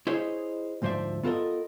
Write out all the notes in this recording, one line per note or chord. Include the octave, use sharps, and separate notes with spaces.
E4 G#4 C5 C#5 D#5
D2 G#2 F3 C5 D5 E5
B3 F4 A4 A#4 D#5